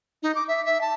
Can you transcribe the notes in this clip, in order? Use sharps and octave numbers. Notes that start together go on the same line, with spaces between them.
D#4
D6
E5
E5
A5